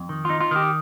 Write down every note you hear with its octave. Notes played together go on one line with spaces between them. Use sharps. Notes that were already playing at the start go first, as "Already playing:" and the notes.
Already playing: F2
D#3
D#4 F4
F4
D#3 G4